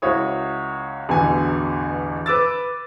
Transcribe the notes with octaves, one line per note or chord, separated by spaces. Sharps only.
C#2 E4 F#4 C#5 D#6
A1 E2 B2 D3 G#5
B4 D6 E6 A6